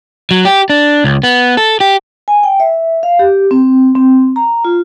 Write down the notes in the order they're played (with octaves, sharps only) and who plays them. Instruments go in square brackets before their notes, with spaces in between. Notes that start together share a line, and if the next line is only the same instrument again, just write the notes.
[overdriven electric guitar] F#3
G4
D4
C#2
B3
A4
G4
[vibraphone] G#5
G5
E5
F5
G4
C4
C4
A#5
F4